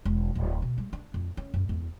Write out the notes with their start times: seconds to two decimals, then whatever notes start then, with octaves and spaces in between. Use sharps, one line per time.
0.05 E1
0.35 D1
0.62 B2
0.78 G3
0.93 D4
1.14 F2
1.37 C#4
1.54 F#2
1.69 E2